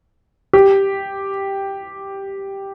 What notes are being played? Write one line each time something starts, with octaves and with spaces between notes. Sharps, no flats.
G4